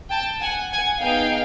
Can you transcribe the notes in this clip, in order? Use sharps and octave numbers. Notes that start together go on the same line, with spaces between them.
G5 A5
F#5 G#5
F#5 G#5
B3 D#4 G#4 F5 G5